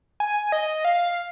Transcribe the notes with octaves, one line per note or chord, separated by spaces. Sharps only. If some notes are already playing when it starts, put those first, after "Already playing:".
G#5
D#5
F5